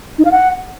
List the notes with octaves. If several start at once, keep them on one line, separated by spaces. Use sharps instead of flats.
D#4
F5
F#5